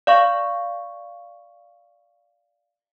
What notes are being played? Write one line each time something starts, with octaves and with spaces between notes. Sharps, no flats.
D5 F5 C#6